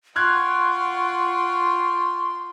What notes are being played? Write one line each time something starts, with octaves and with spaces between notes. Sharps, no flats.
F4 F#5 G5 C6 C#6 F6 F#6 G#6